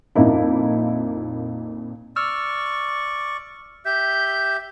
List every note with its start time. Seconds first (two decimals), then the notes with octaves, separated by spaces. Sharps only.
0.16 F2 A#2 A#3 D#4 E4
2.16 D5 C#6 E6 F6
3.85 G4 E5 G6